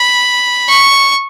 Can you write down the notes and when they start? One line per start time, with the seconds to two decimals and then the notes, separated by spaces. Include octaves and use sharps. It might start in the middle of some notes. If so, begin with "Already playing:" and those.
Already playing: B5
0.69 C#6